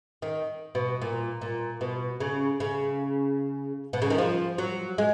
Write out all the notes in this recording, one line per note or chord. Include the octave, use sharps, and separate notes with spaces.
D#3
B2
A#2
A#2
B2
C#3
C#3
B2
C#3
D#3
F3
F#3
G#3